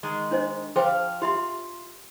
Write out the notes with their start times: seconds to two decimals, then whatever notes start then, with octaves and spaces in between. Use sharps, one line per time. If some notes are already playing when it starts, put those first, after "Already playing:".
0.03 D#3 G#3
0.31 D4 C5 D#5
0.76 F3 G#4 C5 F5 G5
1.22 F4 G4 E5 C6